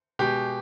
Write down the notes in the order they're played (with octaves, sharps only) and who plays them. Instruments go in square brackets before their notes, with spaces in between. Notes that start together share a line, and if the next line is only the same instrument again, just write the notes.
[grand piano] B2 G#3 G4